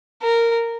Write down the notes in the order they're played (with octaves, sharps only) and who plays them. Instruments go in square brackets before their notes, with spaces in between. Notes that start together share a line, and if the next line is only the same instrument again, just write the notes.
[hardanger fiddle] A#4